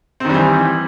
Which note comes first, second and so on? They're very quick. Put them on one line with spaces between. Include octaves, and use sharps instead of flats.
C4 D#3 G3 E3